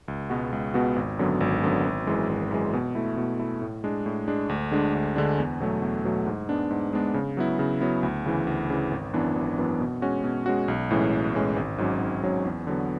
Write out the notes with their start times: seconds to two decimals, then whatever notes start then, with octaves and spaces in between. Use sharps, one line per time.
0.08 C#2
0.30 B2 G#3 B3 F#4
0.52 C#2
0.74 B2 G#3 B3 F#4
0.96 G#1
1.19 F#2 D3 F#3 B3
1.41 G#1
1.62 F#2 D3 F#3 B3
1.85 G#1
2.07 F#2 E3 G#3
2.29 G#1
2.51 F#2 E3 G#3
2.73 B2
2.95 A3 E4
3.17 B2
3.39 A3 E4
3.62 A2
3.84 G#3 D4
4.06 A2
4.28 G#3 D4
4.49 D2
4.72 D3 G#3 D4
4.95 D2
5.16 D3 G#3 D4
5.38 E2
5.60 B2 F#3 A3
5.82 E2
6.04 B2 F#3 A3
6.26 G#2
6.49 G#3 B3 D4
6.70 G#2
6.93 G#3 B3 D4
7.14 C#3
7.37 F#3 B3 E4
7.59 C#3
7.80 F#3 B3 E4
8.03 D2
8.26 C#3 E3
8.47 D2
8.70 C#3 E3
8.91 G#1
9.13 F#2 E3 B3 D4
9.36 G#1
9.58 F#2 E3 B3 D4
9.80 B2
10.02 G#3 C#4 F#4
10.24 B2
10.46 G#3 C#4 F#4
10.68 B1
10.91 A2 E3 G#3 C#4
11.12 B1
11.34 A2 E3 G#3 C#4
11.56 G#1
11.78 G#2 F#3 C#4
12.01 G#1
12.23 G#2 F#3 C#4
12.45 E2
12.67 D3 F#3 B3